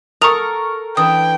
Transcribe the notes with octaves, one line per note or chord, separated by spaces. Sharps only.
A4 A#4 F#5 C#6 D#6 F7
E3 D4 E4 G5 D#6